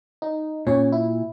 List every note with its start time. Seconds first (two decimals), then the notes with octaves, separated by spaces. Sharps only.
0.22 D#4
0.67 A#2 C#4 C#5
0.92 E4